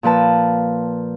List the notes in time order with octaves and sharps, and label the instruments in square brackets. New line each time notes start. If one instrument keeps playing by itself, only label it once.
[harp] A#2 F3 B4 A5